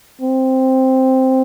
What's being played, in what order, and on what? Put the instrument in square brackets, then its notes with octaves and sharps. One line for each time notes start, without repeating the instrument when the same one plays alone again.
[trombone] C4